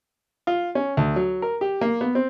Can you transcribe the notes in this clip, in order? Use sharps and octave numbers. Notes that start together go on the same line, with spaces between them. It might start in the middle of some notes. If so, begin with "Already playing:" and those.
F4
C#4
D2
F#3
A#4
G4
A#3
B3
C4